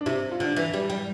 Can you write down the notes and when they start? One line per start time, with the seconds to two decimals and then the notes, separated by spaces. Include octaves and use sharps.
0.01 D4
0.06 C3 E4
0.31 F4
0.40 D3
0.46 D4
0.56 E3 E4
0.74 G3
0.90 G3